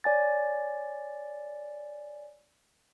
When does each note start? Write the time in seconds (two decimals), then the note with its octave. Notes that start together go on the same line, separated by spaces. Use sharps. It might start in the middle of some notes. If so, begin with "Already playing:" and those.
0.04 C#5 D5 G#5 A6